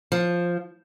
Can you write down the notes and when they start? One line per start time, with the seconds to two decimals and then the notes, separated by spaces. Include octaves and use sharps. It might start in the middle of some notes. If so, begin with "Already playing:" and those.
0.12 F3